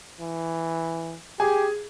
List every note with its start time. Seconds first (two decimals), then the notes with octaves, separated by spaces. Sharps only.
0.20 E3
1.40 G4 G#4